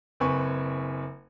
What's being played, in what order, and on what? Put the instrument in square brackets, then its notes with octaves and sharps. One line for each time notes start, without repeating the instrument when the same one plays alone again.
[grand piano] F#1 C4 B4 G#5 C#6